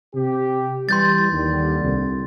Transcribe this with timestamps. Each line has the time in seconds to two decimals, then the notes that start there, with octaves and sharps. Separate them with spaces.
0.14 C3 G4
0.89 E3 G3 C6 G6 A6
1.32 D#2 D3 G3
1.81 C2